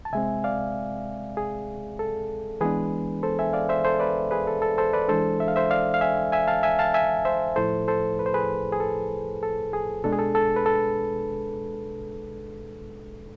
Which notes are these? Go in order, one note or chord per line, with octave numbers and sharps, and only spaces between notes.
A5
C3 G#3 C4 E5 G#5
D5 F5
G#4
A4
E3 G#3 B3 D4 G#4 B4
A4 C5
E5 G#5
D5 F5
C5 E5
A4 C5
B4 D5
G#4 B4
A4
A4
A4 C5
B4 D5
E3 G#3 D4 A4 C5
E5
F5
C5 E5
D5 F5
F5
E5 G#5
E5 G#5
F5 A5
E5 G#5
F5 A5
E5 G#5
C5 E5
A2 F3 A3 E4 A4 C5
A4 C5
B4
C5
G#4 B4
G#4
A4
A4
G#4
B2 G#3 D4 A4
G#4
A4
A4
B4
A4